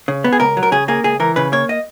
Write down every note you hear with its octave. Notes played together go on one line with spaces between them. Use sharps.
C#3
B3
G#4
C#2 A#4
F#3
A#4
C#3 G#4
A#3 G#4
C#2 G#4
E3 A#4
C#3 B4
A#3 C#5
D#5